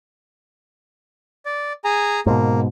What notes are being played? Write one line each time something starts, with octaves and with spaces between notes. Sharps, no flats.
D5
G#4 G#5 A#5
G#2 B2 A#3